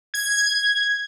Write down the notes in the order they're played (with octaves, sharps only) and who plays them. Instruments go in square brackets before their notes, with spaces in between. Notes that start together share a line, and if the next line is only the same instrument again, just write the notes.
[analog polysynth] G#6